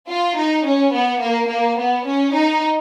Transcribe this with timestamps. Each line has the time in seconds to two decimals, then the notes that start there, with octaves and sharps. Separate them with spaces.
0.08 F4
0.37 D#4
0.65 C#4
0.93 B3
1.21 A#3
1.49 A#3
1.78 B3
2.05 C#4
2.34 D#4